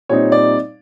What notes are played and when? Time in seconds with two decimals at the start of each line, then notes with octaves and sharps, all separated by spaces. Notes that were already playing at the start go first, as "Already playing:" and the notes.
0.09 A#2 G3 C4 D#4 C#5
0.32 D5